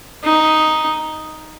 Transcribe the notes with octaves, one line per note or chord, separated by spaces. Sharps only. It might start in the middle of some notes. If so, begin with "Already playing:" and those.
D#4